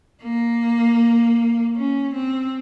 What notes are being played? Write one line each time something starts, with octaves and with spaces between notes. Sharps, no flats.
A#3
C#4
C4